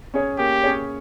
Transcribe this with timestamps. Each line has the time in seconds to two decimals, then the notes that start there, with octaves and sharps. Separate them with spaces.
0.14 C#4 G#4 C#5
0.38 A#3 G4
0.63 C#4 G#4 C#5